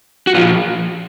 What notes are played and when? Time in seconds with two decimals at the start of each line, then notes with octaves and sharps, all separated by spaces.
0.27 F#4
0.35 A#2 F3 F4